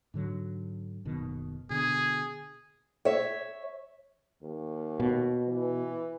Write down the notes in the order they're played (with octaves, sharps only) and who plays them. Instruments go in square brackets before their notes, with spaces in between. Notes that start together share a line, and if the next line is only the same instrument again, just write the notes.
[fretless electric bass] G#2 D3 F#3
F#1 B2 D#3
[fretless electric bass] B2 D3 [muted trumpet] G#4
[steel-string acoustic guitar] C#5 E5
[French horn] D#2
[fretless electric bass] B2
[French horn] E3